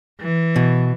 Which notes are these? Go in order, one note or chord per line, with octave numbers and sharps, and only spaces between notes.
E3
B2